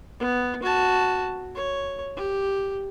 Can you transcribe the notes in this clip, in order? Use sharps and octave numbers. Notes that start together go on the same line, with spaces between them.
B3
F#4 A5
C#5
G4